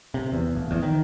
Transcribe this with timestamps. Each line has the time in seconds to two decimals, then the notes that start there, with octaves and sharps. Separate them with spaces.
0.14 C3
0.32 E2
0.55 D1
0.71 E2
0.83 D#3